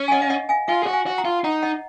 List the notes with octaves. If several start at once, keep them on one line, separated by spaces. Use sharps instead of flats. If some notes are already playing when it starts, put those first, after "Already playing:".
Already playing: C#4
G#5
D#5 F#5
F5
D#5 F#5
F5 G#5
F4 F5 G#5
G#4
F#4
F5 G#5
F#4
F#5 A#5
F4
D#4 F#5 A#5
D#5 F#5